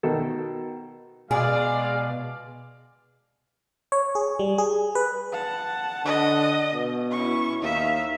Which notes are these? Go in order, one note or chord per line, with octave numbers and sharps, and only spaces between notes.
B2 D#3 A4
B2 G#3 G#4 D5 F5
C#5
G#4
G3
G#4
B4
F#5 A5
D3 D#5
B2
C#4 E4 C#6
D#2 D#4 E5 F5